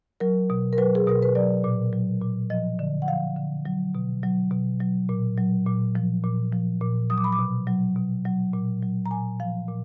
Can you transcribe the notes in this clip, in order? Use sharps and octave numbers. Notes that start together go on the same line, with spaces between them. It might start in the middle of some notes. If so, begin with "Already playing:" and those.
F#3 A#4
B2
A#4
F#3 B4
G#4
B2 A#4
B4
F#3 D5
A#2
F#3
A#2
F3 D#5
D3
F#5
F3 F5
D3
F#3
B2
F#3
B2
F#3
A#2
F#3
A#2
F3
A#2
F3
A#2
F#3 D#6
D6
B5
D6
B2
F#3
B2
F#3
A#2
F#3
A#5
A#2 G#5
F3 F5
A#2